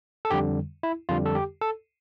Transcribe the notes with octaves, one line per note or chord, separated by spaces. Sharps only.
A4
F2 D3 G3 G4
E4
F2 D3 G3 F4
A4
G4
A4